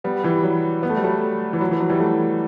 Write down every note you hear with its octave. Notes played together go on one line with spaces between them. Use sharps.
G3 B3
E3 G3
F#3
B3
A3
G3
F#3 A3
E3
F#3
E3
F#3
E3 G3
F#3 A3